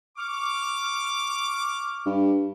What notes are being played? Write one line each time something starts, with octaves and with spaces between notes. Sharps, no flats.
C#6 D6 F6
G2